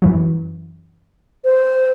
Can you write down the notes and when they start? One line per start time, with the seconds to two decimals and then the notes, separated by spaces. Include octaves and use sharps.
0.02 F#2 E3 F#3
1.45 C5